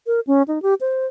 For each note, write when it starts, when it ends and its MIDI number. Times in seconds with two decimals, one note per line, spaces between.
0.07 0.20 70
0.27 0.43 61
0.48 0.61 63
0.62 0.74 67
0.81 1.06 72